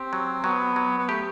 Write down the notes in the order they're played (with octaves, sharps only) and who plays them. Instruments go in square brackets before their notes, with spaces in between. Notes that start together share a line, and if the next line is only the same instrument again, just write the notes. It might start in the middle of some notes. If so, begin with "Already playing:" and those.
Already playing: [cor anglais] C4 [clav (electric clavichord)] G4
[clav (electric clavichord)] F#3
[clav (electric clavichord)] F#3 [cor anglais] B3
[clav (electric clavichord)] F#3
[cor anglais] B3
[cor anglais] A3 [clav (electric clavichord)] G4